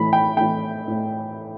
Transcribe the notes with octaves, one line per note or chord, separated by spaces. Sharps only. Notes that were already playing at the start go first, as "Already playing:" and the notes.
Already playing: A2 E3 B5
G5
A2 E3 G5
A2